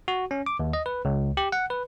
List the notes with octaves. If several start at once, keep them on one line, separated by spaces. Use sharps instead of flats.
F#4
C#4
D6
D#2
D#5
B4
C#2
G4
F#5
B4